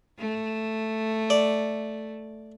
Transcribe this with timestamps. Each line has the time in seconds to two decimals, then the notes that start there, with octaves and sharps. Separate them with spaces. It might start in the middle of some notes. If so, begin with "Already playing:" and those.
0.19 A3
1.30 D5